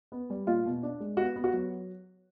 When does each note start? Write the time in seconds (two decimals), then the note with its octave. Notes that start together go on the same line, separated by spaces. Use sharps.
0.12 B3
0.30 G3
0.47 A#2 F4
0.65 B2
0.83 D4
1.00 G#3
1.17 B3 F#4
1.36 B3
1.44 F#4
1.53 F#3